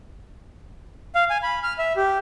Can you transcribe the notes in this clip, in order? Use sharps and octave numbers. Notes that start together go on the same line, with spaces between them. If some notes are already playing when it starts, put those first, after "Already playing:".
F5
G#5
B5
F6
E5
G4